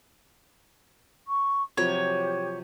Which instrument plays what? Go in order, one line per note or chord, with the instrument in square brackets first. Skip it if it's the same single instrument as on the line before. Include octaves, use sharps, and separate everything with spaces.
[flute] C#6
[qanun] C3 F3 F#3 [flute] G4 [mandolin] C#5